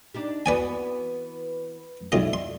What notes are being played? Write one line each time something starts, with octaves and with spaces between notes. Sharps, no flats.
D4 D#4 G4
E3 B3 F#4 B4 D5 G#5
B1 E4 F4 D5 D#5
C6